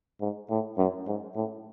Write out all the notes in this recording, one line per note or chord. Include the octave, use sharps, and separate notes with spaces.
G#2
A2
F#2
G#2
A2